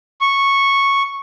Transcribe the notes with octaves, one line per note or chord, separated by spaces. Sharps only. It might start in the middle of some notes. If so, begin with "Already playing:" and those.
C#6